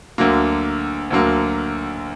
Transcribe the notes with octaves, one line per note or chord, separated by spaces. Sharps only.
D2 D3 F#3 A#3
D2 D3 F#3 A#3